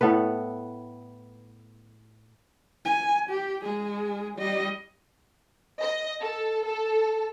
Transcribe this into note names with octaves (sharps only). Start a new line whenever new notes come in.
A2 B3 A4 B4
G#5
G4
G#3 G#4
G3 D#5
D#5
A4
A4